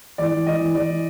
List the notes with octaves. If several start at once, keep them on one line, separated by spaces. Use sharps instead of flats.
E3 D5
E3
E3 D#5
E3
E3 D5
E3